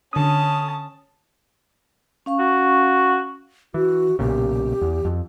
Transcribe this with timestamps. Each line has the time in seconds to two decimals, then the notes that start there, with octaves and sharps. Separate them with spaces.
0.13 D3 C#4 A5 D#6
2.26 C#4 F5 C#6
2.39 F#4
3.74 E3 F#4
4.19 B1 A#2 C#3 G4
4.81 E2
5.05 F2